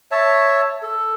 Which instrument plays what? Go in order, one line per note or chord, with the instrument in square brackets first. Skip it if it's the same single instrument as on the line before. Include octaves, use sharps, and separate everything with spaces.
[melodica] C#5 E5 A5
A4